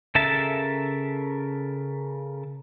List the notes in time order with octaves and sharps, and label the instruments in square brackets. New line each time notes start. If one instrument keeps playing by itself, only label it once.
[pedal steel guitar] C#3 A4 A#4 E5 A5